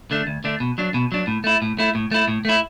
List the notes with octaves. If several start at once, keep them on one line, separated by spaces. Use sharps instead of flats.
D3 A3 D4
D2
D3 A3 D4
B2
F#3 D4
B2
F#3 D4
A2
A3 E4
A2
A3 E4
A2
A3 E4
A2
A3 E4